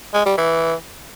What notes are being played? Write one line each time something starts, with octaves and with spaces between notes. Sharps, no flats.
G#3
G3
E3